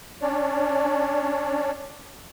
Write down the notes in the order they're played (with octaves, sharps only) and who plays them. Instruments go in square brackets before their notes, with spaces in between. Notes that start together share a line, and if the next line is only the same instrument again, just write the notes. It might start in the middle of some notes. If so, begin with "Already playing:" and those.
[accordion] C#4 D4 C#5 D5